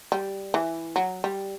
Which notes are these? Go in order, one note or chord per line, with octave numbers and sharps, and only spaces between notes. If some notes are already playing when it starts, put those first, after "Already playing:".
G3
E3
F#3
G3